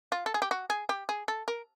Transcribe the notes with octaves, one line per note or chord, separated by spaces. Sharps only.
F4
A4
G#4
G4
F#4
G#4
G4
G#4
A4
A#4